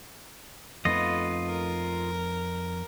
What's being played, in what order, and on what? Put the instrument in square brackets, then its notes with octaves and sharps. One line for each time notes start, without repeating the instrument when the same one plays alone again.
[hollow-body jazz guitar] F2 A3 D#4 [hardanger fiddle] B3 [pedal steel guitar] F4 D#5
[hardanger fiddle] A#4